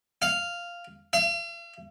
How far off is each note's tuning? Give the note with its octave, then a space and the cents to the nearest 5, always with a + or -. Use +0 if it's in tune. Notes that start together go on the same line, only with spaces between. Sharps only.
F5 -5
F5 -45